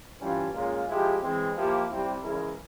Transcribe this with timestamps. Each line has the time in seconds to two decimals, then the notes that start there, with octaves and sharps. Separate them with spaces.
0.19 G2 E3 G3 C#4 F4
0.53 A#2 G#3 C#4 F4
0.87 F3 G#3 E4 G4
1.21 E3 G#3 C4
1.55 F3 A#3 E4 G4
1.89 C3 G3 C4 E4
2.23 C#3 E3 G#3 E4 A#4